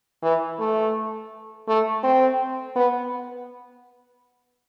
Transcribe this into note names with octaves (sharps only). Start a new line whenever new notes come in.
E3
A3
A3
C4
B3